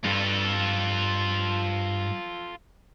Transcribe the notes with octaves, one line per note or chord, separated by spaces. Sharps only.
G2 F4 A4